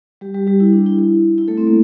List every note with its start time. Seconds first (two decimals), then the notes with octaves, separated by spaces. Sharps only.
0.21 G3 G4
0.34 G3 G4
0.47 G3 G4
0.60 E4
0.73 D4
0.86 E4
0.99 E4
1.38 E4
1.48 A3 A4
1.58 C4
1.67 A#3